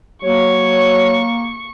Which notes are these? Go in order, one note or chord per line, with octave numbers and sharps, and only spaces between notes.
F#3 A#3 C#5 C#6